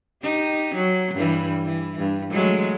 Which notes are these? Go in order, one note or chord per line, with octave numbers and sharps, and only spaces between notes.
D#4 G4
F#3
G2 E3 G3
E3
G2
F#3 G#3 A3